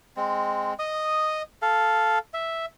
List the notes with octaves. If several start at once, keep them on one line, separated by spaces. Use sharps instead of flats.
G#3 C4
D#5 D#6
A4 F5
E5